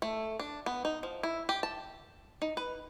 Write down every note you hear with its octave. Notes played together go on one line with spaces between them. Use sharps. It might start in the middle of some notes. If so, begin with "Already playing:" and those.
A3
D4
B3
D#4
F3
E4
G4
A5
D#4
B4